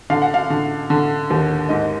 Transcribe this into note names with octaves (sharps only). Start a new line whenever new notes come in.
D3 F5
F#5
F5
D3
D3
D#2
G#2 D#5